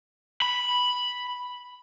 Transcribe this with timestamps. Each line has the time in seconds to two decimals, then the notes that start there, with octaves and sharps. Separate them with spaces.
0.42 B5